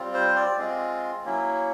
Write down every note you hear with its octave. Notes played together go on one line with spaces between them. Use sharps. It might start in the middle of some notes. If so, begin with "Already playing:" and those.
Already playing: G3 C4 F4
C5
D5
G#3 C4 F4
F#3 A#3 C#4 E4